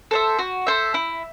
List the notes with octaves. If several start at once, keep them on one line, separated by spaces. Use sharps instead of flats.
A4 C5 E5
F#4
A4 C5 E5
E4